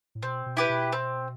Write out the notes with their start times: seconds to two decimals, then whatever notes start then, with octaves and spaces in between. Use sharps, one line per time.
0.15 A2
0.23 B2 C4
0.46 B2
0.57 E4 G4 B4
0.69 B2
0.92 C4